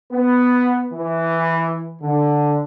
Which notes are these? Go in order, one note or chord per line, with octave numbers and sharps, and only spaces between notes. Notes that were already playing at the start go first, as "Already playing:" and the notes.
B3
E3
D3